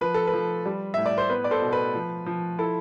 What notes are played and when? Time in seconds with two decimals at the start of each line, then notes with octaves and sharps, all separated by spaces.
0.01 F3 B4
0.14 A4
0.27 B4
0.33 F3
0.66 G3
0.94 A2 E5
1.06 D5
1.18 C5
1.30 B3 B4
1.44 D5
1.51 A4 C5
1.62 B2
1.72 B4
1.94 F3
2.26 F3
2.58 E4 A4